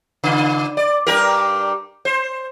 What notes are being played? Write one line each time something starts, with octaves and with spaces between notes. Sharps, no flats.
C#3
D5
G2 G4 A#4
C5